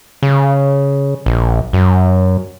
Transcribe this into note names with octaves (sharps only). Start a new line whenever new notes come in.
C#3
A#1
F#2